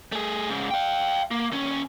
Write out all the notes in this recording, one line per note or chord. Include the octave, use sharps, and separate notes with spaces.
A3 G#4
G#2 C#3
F5 G5
A#3
D#2 C#4